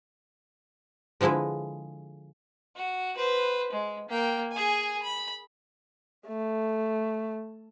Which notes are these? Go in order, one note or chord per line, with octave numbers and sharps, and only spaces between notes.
D3 F3 G#3 E4 B4
F#4
B4 C5
G#3
A#3 G5
G#4 G#5
B5
A3